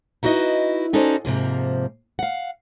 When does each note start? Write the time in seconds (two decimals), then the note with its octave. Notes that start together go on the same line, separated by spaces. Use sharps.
0.23 D#4 E4 F#4 B4 D#5
0.93 C#4 D#4 F#4 A4 C5 D5
1.25 G#2 C3 F3 A#3
2.19 F5 F#5